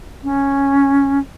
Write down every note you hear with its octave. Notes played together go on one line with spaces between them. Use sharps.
C#4